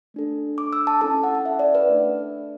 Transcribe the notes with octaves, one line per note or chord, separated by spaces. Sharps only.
A3 D4 A4
D6
E6
A5
C#4 E4 A4 A5
F#5
F#5
E5
D5
B4
A3 D4 A4